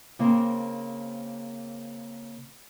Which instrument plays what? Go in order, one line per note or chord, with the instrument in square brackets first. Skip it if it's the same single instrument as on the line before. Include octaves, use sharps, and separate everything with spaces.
[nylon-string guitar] C#3 A#3 C4 A#4 C5